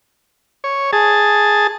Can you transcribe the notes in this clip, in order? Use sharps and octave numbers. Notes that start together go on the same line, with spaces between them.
C#5
G#4 A5